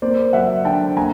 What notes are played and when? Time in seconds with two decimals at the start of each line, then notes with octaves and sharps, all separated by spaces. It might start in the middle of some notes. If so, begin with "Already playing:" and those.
0.02 A#3 C5 D5
0.33 F#3 E5 F#5
0.65 D3 G5 A5
0.97 A#3 G#5 A#5